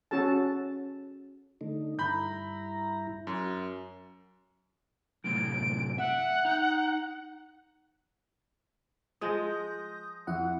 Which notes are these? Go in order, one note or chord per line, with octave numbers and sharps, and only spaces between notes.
C#4 F#4 A4 A5
D3 A3 D#4
G2 E4 A#5 B5 G6
F#2
F#2 A2 C3 D7
E5 F#5
D#4
F3 G#3 D#6 G6 A#6
F2 E4 F#5